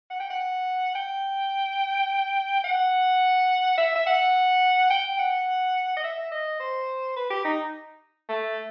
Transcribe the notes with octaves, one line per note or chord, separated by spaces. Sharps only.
F#5
G5
F#5
G5
F#5
E5
E5
F#5
G5
F#5
D#5
E5
D#5
C5
B4
G4
D#4
A3